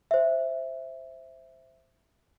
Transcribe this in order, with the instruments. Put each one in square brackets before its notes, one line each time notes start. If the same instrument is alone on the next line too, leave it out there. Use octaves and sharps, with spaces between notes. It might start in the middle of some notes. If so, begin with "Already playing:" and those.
[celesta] C5 E5